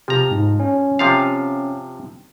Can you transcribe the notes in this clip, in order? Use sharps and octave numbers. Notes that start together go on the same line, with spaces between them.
C3 F3 G4 A#5
G#2
C#4
C3 F3 F5